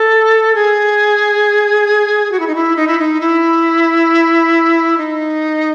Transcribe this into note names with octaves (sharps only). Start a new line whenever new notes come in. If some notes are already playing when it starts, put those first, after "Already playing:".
Already playing: A4
G#4
F#4
E4
D#4
E4
D#4
E4
D#4
E4
D#4